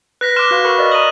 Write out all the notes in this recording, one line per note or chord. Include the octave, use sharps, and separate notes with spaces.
B4 F#6 A#6 B6
C6 D6 F6 E7
F#4 B4 F5
A#4 B5 C#6
A#4 D5 D#5
A#5 D#6 D#7 F#7